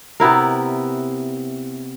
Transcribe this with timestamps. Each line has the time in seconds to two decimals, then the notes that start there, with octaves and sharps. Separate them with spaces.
0.20 C3 B3 E4 A#4